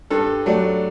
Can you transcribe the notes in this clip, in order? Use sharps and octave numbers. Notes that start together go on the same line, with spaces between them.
G2 A4
F#3 A3 D4